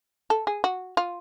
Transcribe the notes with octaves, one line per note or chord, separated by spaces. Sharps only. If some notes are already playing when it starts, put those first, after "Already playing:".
A4
G#4
F#4
F4